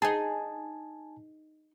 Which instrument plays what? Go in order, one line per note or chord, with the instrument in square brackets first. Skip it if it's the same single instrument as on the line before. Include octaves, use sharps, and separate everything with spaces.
[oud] D#4 G#4 [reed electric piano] G#5 A5